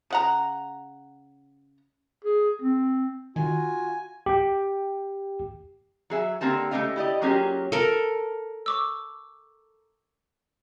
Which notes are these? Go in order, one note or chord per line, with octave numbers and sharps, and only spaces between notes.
C#3 F#5 A#5
G#4
C4
D#3 F4 F#4 G#5
G4 G5
F#3 G#4 E5
D3 A#3 C4 G4 A5
A3 A#3 C#4 G4 D#5 F5
E4 G4 D5 D#5
F#3 A#3 C#4 F4 G4 G#4
A4 A#4
C#6 D6 E6